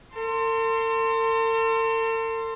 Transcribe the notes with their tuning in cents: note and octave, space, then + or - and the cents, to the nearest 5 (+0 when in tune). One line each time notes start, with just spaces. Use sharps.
A4 +45 C6 +0